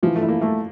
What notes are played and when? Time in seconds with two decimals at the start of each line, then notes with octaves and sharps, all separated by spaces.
0.03 E3 F3
0.16 A3
0.23 E4
0.28 A#3
0.41 A3 A#3